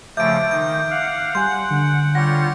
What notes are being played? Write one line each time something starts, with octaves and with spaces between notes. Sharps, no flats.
C#3 F3 A3 E5 D6 G6 D7
D#3 D#4 G6
F5 F#5
G3 F#5 G#5 C6 G6
D3
G3 F4 C#5 F#5 A#6 C#7